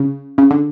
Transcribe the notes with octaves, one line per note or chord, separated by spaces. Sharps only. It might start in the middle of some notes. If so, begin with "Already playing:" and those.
Already playing: C#3
C#3
D3